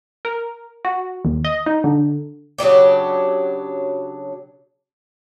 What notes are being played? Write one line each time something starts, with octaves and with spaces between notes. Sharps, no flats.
A#4
F#4
D#2
D#5
D#4
D3
C#3 F#3 D4 G4